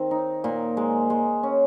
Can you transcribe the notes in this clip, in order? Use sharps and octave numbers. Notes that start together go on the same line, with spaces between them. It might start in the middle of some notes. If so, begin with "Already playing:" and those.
Already playing: D#3 C4
D#4
A#2
G#3
G#3
C#4